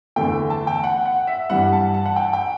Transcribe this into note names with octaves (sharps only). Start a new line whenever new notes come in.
E2 D3 A3 G5
A5
G5
F#5
F#5
E5
G2 E3 G3 F#5
A5
A5
F#5
G5
G5